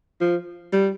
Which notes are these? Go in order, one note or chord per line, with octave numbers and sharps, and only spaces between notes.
F3
G3